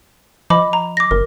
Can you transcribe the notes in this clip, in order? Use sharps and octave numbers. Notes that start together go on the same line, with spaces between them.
F3 D#5 B5 D6
A#5
D6 A#6
G1 A#4